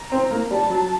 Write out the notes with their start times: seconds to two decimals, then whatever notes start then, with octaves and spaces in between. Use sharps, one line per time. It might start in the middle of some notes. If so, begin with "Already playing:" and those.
Already playing: A#5
0.12 C4
0.31 A#3
0.51 G3 A5
0.70 F#3